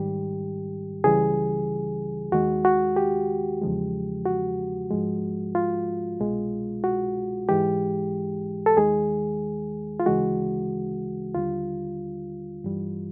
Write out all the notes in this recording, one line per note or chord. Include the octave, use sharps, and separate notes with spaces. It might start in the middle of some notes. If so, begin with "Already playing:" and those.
Already playing: G#2 D#3 G3 G4
C#2 C#3 E3 G3 G#4
D#2 D#3 G#3 F#4
F#4
G4
E2 C#3 F3 G#3
F#4
G#2 F3 G#3
F4
C2 B2 G#3
F#4
G#2 E3 G#3 G4
A4
D#2 D#3 G#3 G#4
F4
D2 C#3 E3 G#3 F#4
D#2 D3 G3 F4
G2 E3 G3